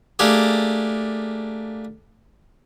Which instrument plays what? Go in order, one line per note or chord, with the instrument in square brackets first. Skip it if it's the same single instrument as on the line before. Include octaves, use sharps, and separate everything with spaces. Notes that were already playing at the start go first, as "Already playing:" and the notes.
[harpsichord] A3 A#3 D4 G4 G#4